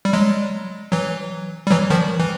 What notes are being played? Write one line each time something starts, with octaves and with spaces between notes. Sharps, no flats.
G3
F#3 G#3
E3 F#3
G3
E3 F#3
D#3 F3
E3